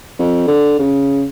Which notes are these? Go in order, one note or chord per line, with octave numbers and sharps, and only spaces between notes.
F2
D3
C#3